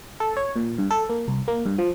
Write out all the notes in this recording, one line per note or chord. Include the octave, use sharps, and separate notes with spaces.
A4
C#5
A#2
G2
A4
A#3
C2
A#3
G2
F3